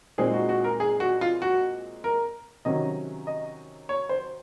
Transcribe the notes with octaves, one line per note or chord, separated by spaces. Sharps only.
A#2 G#3 C4 D#4 G#4
F#4
F#4
A#4
G#4
F#4
F4
F#4
A#4
C3 D#3 F#3 C#4 D#5
D#5
C#5
C5